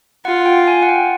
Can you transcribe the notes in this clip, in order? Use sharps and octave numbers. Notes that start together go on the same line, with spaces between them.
F4 F#5
G5
G#5
F#5
G5